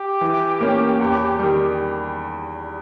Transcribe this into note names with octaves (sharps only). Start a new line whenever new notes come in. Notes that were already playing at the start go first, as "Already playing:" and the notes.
Already playing: G4
E3
A#3 C#4
E2
D#3 G3